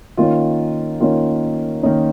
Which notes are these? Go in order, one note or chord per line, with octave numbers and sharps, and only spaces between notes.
D#3 A#3 C#4 F4
D#3 A#3 C#4 F4
D#3 A#3 C#4 D#4